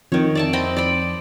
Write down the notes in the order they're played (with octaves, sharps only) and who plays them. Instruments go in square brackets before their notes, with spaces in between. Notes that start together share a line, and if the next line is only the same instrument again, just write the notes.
[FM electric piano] F2 [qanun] D#3 C#5
[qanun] D5 E5 A5
C4 D#5 B5
D5 B5